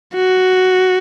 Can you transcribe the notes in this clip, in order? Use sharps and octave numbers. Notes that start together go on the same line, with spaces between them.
F#4